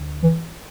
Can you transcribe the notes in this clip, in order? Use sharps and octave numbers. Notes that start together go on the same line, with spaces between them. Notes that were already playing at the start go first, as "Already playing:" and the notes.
Already playing: D2 D3
E3